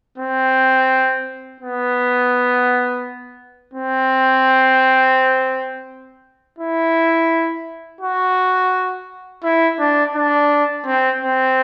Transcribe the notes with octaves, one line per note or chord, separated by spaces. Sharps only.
C4
B3
C4
E4
F#4
E4
D4
D4
C4
C4